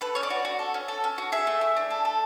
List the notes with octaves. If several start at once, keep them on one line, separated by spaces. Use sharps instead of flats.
A4 B4
C#4 C#5
D5
F#4
F#4
A4
C#4
A4
C#4
F#4
G#4 E5
A3
E4
D4
A4
A4